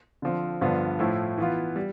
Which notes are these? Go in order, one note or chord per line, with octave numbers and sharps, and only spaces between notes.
D3 F3 C4
G2 D3 F3 B3 F4
A2 F3 A3 E4
E3 B3 F4
G3